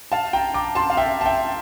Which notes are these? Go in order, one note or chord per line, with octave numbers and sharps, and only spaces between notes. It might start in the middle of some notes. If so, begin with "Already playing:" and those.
F5 A5
G5 A#5
A#5 D6
A5 C6
F5
E5 G5
A5
E5 G5